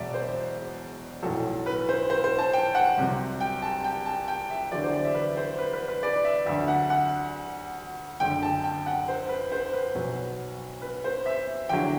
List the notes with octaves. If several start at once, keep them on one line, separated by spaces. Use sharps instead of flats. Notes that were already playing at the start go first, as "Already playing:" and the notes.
Already playing: E1 E2 B2 F#3 D5 E5
C5
B1 A2 F#3 A4
B4
C5
C5
C5
A5
G5
F#5
C2 C3 F#3
G5
A5
G5
A5
G5
E5
E2 D3 F#3 D5
C5
D5
E5
B4
C5
B4
B4
B4
D5
E5
D2 D3 F#3 E5
F#5
F#5
F#1 F#2 D3 G5
A5
G5
F#5
C5
B4
C5
B4
B1 B2 F#3
B4
C5
E5
E2 D3 F#3 G5